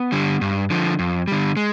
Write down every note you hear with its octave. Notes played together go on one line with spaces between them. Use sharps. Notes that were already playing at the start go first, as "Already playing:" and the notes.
Already playing: B3
D3 G3
G2
D3 F3
F2
D3 G3
G#3